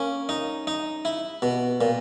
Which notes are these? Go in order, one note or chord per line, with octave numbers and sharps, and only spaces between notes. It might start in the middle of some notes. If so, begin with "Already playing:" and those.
Already playing: A#3 C#4
D#4
D#4
E4
B2
A#2